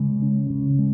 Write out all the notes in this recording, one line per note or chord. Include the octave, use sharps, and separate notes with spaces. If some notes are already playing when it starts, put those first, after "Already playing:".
Already playing: C#3 G#3
C#4
C#3
G#3